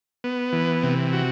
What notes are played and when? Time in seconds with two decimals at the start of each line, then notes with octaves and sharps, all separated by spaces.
0.24 B3
0.53 E3
0.83 C3
1.13 F#4